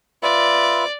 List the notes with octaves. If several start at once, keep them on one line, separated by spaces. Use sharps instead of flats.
F4 B4 D5 E5